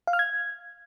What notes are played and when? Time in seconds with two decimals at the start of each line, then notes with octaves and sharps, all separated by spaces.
0.07 F5
0.13 F6
0.19 G#6